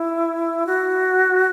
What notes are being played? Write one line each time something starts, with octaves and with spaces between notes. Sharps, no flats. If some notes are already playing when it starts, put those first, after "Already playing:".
Already playing: E4
F#4